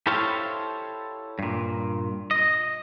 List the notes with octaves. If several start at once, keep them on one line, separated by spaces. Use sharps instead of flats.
E4 G4 A4 C5 C#5 F5
G2 A#2
D#5